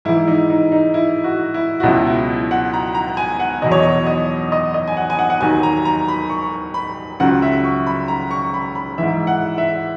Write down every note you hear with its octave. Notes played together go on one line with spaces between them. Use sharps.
G#2 E3 E4
D#4
D#4
D#4
E4
F#4
E4
F#4
C#2 B2 F#3 E4
E4
F#5
A#5
A#5
G#5
F#5
E2 B2 F#3 D#5
C#5
D#5
D#5
D#5
D#5
G#5
F#5
G#5
F#5
F#5
D#2 D#3 F#3 G#5
A#5
A#5
B5
C#6
B5
C#2 C#3 F#3 F#5
E5
C#6
B5
A#5
C#6
B5
B5
G#2 E3 E5
F#5
E5